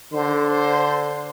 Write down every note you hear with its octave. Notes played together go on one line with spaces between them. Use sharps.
D3 C5
C5